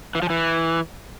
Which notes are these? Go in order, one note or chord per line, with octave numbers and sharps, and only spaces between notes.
E3
F3
E3